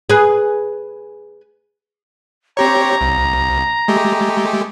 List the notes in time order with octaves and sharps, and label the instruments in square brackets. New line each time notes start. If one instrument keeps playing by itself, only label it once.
[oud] G#4 B4
[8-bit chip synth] C4 G4 C#5 [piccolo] A#5
[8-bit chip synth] C2
G#3 A3 G4